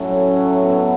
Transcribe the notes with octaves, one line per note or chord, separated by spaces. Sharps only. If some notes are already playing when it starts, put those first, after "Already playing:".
Already playing: A2 F#3 A3 C#4
B3